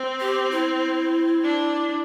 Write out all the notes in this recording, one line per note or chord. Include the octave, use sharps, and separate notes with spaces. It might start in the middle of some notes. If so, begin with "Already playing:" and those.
Already playing: C4
G4
E4
D4